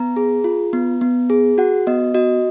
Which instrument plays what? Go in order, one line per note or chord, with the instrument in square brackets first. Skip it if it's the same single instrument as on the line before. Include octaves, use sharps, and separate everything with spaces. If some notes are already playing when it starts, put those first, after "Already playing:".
Already playing: [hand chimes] B3 A#5
G#4
F4
B3
B3
G#4
F#4 F#5
B3 D#5
F#4 D#5